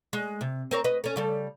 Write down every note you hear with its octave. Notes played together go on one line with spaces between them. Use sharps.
G#3
C3
C4 A#4 C#5
B4 D#5
C#4 A4
C#3 G3 A4